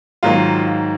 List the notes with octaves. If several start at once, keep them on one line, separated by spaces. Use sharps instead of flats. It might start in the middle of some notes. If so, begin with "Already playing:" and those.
G#2 D#3 F#3 A#3 F4